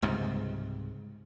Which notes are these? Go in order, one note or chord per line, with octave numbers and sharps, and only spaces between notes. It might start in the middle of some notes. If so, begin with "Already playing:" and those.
C#2 G#2 C3 G3